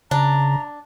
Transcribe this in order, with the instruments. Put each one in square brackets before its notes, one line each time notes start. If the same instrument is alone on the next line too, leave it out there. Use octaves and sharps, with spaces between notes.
[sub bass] C#3 [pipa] D4 [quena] A#5